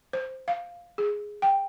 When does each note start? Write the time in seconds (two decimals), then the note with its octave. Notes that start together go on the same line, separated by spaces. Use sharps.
0.13 C5
0.48 F5
0.98 G#4
1.42 G5